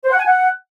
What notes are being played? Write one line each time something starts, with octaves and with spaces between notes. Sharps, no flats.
C5
F#5
G#5
F#5